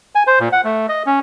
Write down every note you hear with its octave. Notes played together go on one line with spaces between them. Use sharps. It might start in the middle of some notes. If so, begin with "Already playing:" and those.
G#5
C5
A#2
F#5
A3
D#5
C#4